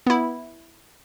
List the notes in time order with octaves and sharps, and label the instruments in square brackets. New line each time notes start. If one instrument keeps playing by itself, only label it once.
[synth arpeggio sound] B3 E4